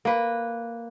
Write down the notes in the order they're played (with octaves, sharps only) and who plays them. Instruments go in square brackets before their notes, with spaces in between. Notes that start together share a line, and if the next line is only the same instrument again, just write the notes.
[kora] A#3 B4